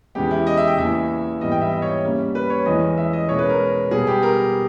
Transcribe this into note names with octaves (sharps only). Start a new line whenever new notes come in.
E2 C#3 G#3 B3 G4
E4
D#5
E5
G5
E2 C#3 E3 A#3 E5
G#2 E3 G3 B3 D#5
G5
E5
D#5
C#5
C#3 G3 A#3 C#4
B4
C#5
E2 C#3 E3 G#3 C#4 D#5
E5
D#5
B2 G#3 C#4 C#5
B4
A#4
B2 G3 B3 G#4
G4
A#4